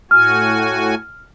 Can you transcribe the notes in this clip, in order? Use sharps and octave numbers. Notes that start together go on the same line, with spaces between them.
A2 F#4 G#5 F6